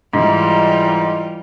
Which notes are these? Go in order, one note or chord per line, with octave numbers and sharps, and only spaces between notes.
G#2 E3 G3 F4